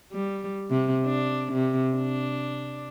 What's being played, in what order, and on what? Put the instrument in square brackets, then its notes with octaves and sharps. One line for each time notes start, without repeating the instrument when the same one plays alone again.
[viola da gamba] G3
C3
D4
C3
D4